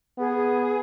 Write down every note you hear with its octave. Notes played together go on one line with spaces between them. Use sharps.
B3 G#4